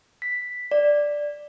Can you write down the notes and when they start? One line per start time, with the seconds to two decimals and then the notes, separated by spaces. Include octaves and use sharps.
0.22 B6
0.71 D5